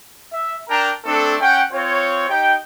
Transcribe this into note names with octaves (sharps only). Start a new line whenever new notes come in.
E5
D4 A#4 G5 A5 A#5
A3 C4 D4 A4
C#4 F#5 G5
C4 F4 C#5
D#4 G4 G5